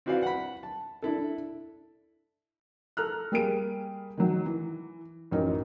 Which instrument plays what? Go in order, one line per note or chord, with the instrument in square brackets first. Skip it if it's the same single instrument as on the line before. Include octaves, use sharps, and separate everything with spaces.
[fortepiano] C4 E4 F#4 B4 D5 F5
F#5 B5
A5
D4 E4 A4
[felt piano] A4 A#5 F6 F#6
G3 A#3 G#4 D7 D#7
D#3 F#3
E3
A1 F#2 D#4 A#4